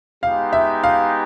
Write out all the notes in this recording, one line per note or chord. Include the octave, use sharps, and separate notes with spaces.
G#3 B3 D#4 G4 F5
E5
F5